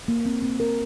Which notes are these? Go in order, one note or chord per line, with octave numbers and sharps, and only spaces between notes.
A#3
C4
C4
A#4